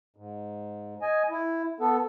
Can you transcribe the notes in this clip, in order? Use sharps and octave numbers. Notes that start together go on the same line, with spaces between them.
G#2
D#5 G#5
E4
B3 A4